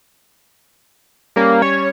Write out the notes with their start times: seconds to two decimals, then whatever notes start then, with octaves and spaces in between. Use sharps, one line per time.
1.36 G3 A#3 C#4
1.62 C#5